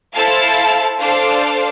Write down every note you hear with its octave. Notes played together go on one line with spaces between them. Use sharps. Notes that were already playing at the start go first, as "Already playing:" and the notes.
E4 A4 C5 F5 A5
D4 A4 C5 F5